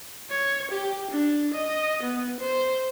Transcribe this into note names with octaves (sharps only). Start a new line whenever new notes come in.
C#5
G4
D4
D#5
B3
C5